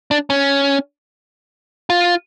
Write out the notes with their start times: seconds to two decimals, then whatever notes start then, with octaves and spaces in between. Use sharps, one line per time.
0.11 D4
0.30 C#4
1.90 F4